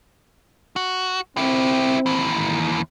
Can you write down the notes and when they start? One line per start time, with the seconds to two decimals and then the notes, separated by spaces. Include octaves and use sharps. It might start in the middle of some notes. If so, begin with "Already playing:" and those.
0.76 F#4
1.37 C4 E4 G4
2.06 D#2 E3